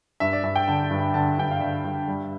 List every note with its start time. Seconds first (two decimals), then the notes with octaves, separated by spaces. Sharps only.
0.20 G2 E5
0.33 D5
0.43 G2 E5
0.55 G5
0.68 D3 A5
0.84 A5
0.91 G2
0.99 B5
1.14 D3 A5
1.38 G2 G5
1.51 F5
1.61 D3 E5
1.84 G2
2.08 G3